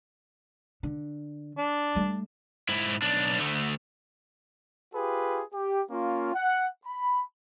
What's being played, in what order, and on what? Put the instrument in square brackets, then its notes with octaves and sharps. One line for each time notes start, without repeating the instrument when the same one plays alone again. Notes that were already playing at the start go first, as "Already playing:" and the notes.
[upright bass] D3
[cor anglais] D4
[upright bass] G3 A3
[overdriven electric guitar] G#2 E4
B1 D4
D2 A3
[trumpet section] F4 G4 G#4 B4
G4
A#3 C#4 F4
F#5
B5